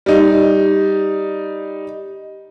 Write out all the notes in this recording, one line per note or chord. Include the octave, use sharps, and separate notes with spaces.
G3 D#4